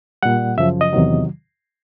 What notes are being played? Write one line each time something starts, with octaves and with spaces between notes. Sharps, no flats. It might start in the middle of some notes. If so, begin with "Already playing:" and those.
A#2 G3 F#5
F#2 C#3 F3 E5
D#5
E2 C3 D#3 F#3